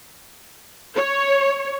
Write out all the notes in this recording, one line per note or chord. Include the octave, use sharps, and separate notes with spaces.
C#5